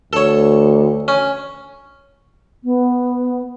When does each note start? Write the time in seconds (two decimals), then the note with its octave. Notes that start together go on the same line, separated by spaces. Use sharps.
0.13 D2 A4 C#5
1.08 C#4
2.64 B3